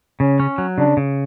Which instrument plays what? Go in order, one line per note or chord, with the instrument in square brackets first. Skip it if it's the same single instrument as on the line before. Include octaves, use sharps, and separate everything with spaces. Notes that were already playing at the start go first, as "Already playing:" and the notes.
[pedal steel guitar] C#3 [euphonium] C#4
[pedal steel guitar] C#4
F#3
[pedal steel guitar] C#3 [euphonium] D4
[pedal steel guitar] C#3